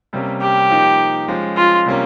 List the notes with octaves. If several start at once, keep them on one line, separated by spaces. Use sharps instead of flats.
C3 G3 A#3 C#4
G4
F3 A#3 D#4
F3 G#3 C#4
F4
C3 G3 A#3 C#4